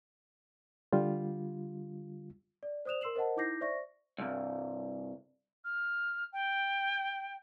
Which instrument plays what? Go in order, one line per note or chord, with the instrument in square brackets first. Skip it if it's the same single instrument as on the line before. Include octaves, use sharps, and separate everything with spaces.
[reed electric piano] D3 G3 F4
[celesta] D5
C5 D5 D#6 F#6 E7 F7
A#4 C6 E6 C7 E7 F#7
A#4 C5 D#5 F#5 A5
D#4 E4 D6 G6 A#6 C7
C5 D5 E5 C#6 A#6
[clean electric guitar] C2 G2
[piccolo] F6
G5